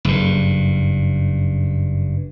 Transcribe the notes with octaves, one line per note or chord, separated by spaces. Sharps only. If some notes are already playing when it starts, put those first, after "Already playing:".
F#1 G2